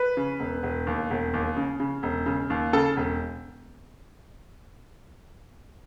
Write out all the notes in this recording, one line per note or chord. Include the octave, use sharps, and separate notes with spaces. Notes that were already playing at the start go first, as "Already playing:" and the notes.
Already playing: B4
C#3
E1
E1
D#2
E1
D#2
C#3
C#3
E1
C#3
D#2
C#3 A4
E1